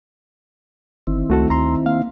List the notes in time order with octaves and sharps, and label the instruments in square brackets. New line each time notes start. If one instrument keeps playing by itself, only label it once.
[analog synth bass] G1 [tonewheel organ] D#3 C4 E4
[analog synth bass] C#2 [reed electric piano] A3 F#4 A4
[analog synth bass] D2 [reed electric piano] A#5 C6
[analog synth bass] A#3 [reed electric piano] F5